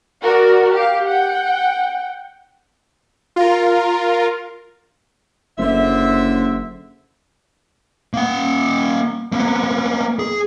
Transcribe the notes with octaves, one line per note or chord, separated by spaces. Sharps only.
F#4 A#4 D5
G4 F5
F#5 G5
F4 A#4
F#1 D3 C5 E5
A#3 F#5
A#3 B3
G#4